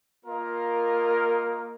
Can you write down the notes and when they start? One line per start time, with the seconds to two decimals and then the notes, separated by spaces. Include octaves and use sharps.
0.24 A#3 F4 A#4 D#5